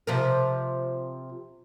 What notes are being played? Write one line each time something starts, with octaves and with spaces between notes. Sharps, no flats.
C3 F3 A#4